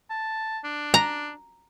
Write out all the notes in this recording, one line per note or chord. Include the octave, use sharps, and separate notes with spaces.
A5
D4
A#5